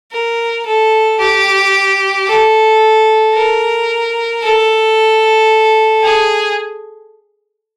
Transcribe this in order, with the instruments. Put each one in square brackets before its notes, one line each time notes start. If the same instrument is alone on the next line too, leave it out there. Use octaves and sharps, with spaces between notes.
[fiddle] A#4
A4
G4
A4
A#4
A4
G#4